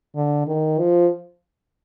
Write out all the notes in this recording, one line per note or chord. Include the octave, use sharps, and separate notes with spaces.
D3
D#3
F3